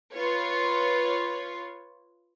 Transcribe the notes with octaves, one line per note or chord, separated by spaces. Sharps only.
F4 B4 C#5